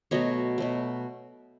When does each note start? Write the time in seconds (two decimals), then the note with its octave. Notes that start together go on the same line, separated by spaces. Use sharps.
0.11 B2 F#3 A3 C#5 D#5
0.58 B2 F#3 A3